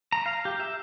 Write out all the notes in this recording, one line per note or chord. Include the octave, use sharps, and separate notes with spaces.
A#5
F5
G4
E5